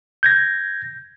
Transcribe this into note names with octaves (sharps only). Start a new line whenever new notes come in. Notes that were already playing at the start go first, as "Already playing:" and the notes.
G6 G#6 A#6